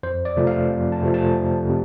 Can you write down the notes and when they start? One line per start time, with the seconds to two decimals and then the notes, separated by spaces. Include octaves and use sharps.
0.03 F2 C5
0.25 D5
0.37 C3 F3 A3
0.47 F5
0.70 F2
0.92 A5
1.03 C3 F3 A3
1.14 A5
1.36 F2
1.70 C3